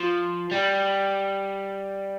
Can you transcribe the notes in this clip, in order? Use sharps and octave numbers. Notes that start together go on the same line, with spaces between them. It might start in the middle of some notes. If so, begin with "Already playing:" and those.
Already playing: F3
G3